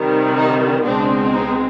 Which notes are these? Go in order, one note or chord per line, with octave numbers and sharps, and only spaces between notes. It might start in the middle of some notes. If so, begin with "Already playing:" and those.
Already playing: C3 D#3 G3
D#4
C#2 B2 G#3 C4 D4
D#4